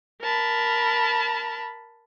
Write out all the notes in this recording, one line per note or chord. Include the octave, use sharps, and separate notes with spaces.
A#4 A5 B5